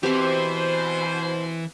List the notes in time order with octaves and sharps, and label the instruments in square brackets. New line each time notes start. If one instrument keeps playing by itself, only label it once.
[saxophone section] B2 C5 [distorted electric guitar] E3 [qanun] C4 G4